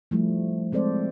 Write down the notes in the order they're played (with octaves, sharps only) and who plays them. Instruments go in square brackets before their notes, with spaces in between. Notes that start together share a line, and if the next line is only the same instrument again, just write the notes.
[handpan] F3 G3 A3 E4
G#3 C4 A4 C5 D5